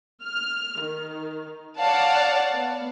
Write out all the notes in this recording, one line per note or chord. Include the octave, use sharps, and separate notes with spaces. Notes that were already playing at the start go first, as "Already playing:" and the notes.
F6
D#3
C#5 D5 F5 F#5 A5
B3